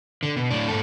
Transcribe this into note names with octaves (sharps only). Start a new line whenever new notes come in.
D3
B2
A2 D4
G#2 A4